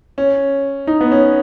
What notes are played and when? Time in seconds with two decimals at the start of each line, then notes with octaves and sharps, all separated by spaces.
0.18 C#4
0.87 D#4
1.01 B3
1.12 C#4